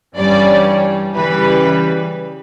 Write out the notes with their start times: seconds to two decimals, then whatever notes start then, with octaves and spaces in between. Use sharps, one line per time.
0.17 G2 E3 G3 C#4 D5
1.16 C#3 E3 G3 B4